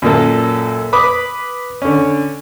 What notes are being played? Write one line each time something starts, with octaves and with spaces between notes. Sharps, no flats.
F#2 A#2 A#3 A4
B4 B5 D6 D#6
D3 C#4